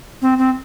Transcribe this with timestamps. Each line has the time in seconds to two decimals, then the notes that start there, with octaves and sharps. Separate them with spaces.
0.22 C4
0.38 C4